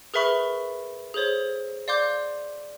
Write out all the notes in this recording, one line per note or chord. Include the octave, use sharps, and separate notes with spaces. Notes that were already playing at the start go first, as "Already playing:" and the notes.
G#4 A#4 B4 E5 B5 C#6
G#4 A4 C5 C#5
D5 F5 C6 D6 G6